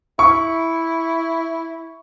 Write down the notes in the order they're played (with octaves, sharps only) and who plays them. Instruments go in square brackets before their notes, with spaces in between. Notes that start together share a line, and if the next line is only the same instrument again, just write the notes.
[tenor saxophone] E4 [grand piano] C#6